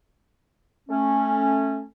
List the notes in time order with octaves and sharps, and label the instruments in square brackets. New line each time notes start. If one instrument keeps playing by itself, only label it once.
[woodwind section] A3 C#4